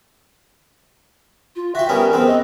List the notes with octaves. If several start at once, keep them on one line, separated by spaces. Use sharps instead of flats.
F4
F#4 E5 G5
G3 B3 C#4 A#4
E2 B3 C4
D#5